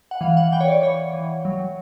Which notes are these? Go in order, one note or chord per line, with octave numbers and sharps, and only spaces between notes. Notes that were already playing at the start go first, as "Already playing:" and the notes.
F#5
E3 F5
F#5
E3 G5
C#5
D5
E3 C#5
E3
F#3